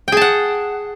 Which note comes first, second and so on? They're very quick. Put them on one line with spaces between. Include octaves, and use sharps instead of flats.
G5 G#4 A5 F#5